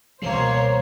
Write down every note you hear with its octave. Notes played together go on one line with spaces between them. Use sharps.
C#2 B2 E3 G3 A#3 C5 C#5 C7